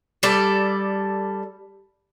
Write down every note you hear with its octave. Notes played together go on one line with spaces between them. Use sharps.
G3 A4 D5